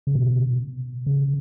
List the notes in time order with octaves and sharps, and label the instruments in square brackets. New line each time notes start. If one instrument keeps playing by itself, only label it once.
[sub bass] C#3
B2
C#3